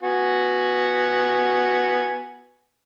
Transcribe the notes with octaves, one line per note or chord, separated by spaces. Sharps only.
B3 F#4 G#5